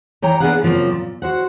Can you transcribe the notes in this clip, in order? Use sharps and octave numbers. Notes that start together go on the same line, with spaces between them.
E3 C#5 G5 A#5
A#3 B3 D4 G#4 F5 F#5
C#3 F3 F#3 A#3 C4
A#2
F#4 C5 F#5